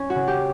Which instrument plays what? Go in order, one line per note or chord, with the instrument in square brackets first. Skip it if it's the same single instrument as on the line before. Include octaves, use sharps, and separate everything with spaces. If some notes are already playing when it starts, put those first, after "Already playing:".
Already playing: [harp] C#4
F#4
C#3
G4